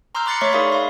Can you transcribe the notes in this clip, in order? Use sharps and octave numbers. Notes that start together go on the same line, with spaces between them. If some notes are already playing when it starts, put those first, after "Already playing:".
A#5 C6 D6 E6 F6 G6
B5 D6 F#6 A6 C7 C#7
A3 C#5 E5 C#6 D6 B6
D#4 G#4 A#4 D5 F5 B5
E5 F5 C6